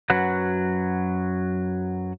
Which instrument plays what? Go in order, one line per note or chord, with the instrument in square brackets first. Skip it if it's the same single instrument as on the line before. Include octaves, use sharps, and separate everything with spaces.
[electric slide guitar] F#2 F#3 F#4 B4 F#5